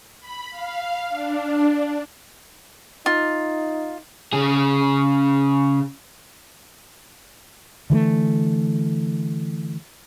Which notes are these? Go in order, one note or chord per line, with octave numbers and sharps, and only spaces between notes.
B5
F5
D4
D#4 F4
C#3 G#4
D3 E3 G3 A3